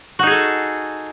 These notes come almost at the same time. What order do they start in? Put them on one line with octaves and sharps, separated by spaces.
F#4 D#4 G#4 A4